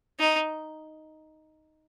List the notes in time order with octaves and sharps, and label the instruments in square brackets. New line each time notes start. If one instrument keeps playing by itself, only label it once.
[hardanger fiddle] D#4